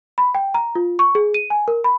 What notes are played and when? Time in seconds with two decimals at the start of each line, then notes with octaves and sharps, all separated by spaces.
0.18 B5
0.35 G5
0.54 A#5
0.75 F4
0.99 C#6
1.15 G#4
1.34 D#7
1.50 G#5
1.68 A#4
1.84 B5